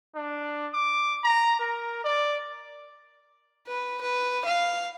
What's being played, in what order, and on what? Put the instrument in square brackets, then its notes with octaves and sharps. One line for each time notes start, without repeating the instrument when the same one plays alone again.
[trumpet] D4
D6
A#5
A#4
D5
[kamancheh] B4
B4
F5